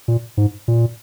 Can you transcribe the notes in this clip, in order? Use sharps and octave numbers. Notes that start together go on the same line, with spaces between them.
A#2
G#2
A#2